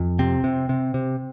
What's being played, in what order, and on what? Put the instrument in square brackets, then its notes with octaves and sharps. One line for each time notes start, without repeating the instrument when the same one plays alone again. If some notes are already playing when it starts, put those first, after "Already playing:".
Already playing: [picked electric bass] F2
C3 C4
C3
C3
C3